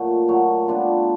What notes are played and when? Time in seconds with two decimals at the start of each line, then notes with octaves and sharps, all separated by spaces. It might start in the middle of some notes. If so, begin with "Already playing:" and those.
Already playing: A#2 F#3 A3
0.28 A#2 F#3 A3
0.68 G3 B3 D4 F4